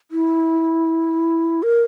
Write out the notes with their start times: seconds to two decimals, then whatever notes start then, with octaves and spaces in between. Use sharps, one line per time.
0.11 E4
1.63 A#4